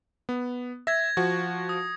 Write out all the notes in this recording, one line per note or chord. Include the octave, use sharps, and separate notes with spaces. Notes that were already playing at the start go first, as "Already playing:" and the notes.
B3
E5 G#6 A#6
F3 F#4
D#6